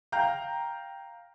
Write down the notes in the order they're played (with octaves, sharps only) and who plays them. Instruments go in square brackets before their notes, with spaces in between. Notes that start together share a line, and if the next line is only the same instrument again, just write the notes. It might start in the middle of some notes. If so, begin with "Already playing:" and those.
[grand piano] F5 G5 A#5 G6